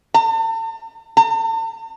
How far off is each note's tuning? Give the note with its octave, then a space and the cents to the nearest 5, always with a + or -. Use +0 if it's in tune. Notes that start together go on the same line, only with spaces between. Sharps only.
A5 +40
A5 +45